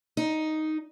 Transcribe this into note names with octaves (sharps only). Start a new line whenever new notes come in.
D#4